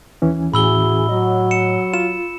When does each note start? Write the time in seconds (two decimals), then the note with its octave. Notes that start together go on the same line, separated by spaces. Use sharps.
0.22 D#2 E3 C#4
0.54 A2 E4 F#4 G#4 B5 E6 G7
1.09 F#3 D#5
1.51 C#7 E7
1.94 F4 E7